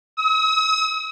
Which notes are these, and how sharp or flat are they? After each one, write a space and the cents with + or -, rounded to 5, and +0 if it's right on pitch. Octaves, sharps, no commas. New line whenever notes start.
D#6 +45